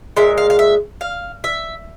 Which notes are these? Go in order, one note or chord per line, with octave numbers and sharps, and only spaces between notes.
A#2 G#3 E5
F5
F5
E5
F5
E5